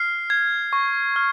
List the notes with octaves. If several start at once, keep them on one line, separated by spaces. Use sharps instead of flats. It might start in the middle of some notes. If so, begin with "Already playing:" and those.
Already playing: F6 C7
G#6
C#6
F6